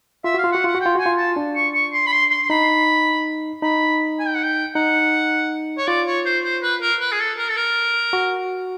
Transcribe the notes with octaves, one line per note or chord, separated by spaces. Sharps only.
F4 E5
F#4 F5
F4
F#4 F#5
F4 F#5
F#4
F4 G5
F#4 G#5
F4
A5
D4
C#6
C#6
C6
B5
C6
C6
C6
D#4 B5
D#4 B5
G#5
G5
F#5
G5
D#4 F#5
C#5
F4 D5
C#5
C5
C5
B4
A#4
B4
G#4
A4
A#4
A4
A#4
F#4